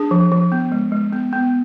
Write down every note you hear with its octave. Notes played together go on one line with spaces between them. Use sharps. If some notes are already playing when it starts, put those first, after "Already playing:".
Already playing: D4 G#4
F3
F3
B3
G#3
G#3
B3
B3